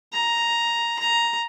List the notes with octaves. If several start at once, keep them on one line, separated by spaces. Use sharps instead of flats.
A#5
A#5